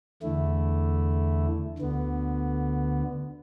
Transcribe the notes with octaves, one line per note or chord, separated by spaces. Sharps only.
E2 D3 A3 E4
D2 D3 B3